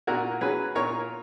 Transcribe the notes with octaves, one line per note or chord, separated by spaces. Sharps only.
A#2 F#4 A#4
F#3 C#4 G#4 B4
A#2 A#4 C#5